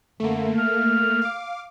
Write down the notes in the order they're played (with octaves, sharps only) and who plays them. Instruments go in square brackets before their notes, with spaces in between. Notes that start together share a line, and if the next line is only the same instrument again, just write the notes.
[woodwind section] F#2 D3 [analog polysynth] A3 A#3
[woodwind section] F6
[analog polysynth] F5 D6